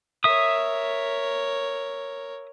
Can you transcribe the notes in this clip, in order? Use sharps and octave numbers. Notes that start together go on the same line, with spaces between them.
A#4 C#5 E5 D#6